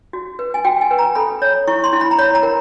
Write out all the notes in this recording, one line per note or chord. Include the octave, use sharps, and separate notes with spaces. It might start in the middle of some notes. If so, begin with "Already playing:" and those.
F#4
B4
G#5
F#4 G5
G#5
B4
A#5
A4 B5
C#5
E4 C#6
C6
E4
B5
A#5
C#5 B5
A#5
A#4